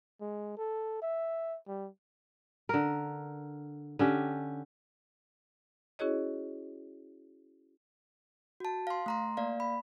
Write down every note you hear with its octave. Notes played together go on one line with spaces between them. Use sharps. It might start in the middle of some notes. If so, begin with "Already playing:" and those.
G#3
A4
E5
G3
D3 A#4
D3 C#4 G4
C#4 E4 F#4 G#4 C#5 D#5
F#4 A5
F5 C6
A3 A#5 C6
A#3 D5 F5
B5